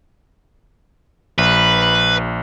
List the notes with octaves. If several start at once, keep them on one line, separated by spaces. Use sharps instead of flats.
A#1 B4